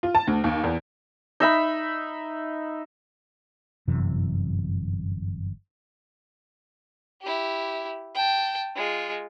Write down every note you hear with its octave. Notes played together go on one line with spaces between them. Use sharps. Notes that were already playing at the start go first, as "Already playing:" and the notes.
F4
A5
D2
D#2
E2
D#4 E5 B5
G1 F#2 C3 E3
E4 G4
G5 A5
G#3 F4